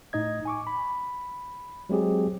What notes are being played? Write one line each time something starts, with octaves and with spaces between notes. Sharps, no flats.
A2 D#4 D#5 G#6
G#5 C#6 D6
B5
F#3 G#3 C4 G4 G#4